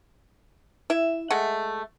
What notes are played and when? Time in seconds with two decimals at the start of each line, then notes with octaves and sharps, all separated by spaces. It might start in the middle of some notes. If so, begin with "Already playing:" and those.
0.90 E4 E5
1.30 G#3 A3 F#5